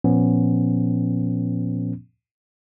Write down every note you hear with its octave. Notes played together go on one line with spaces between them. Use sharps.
A#2 F3 B3 C#4